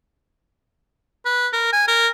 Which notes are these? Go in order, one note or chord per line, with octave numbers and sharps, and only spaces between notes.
B4
A#4
G#5
A#4